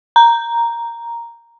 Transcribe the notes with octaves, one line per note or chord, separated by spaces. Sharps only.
A#5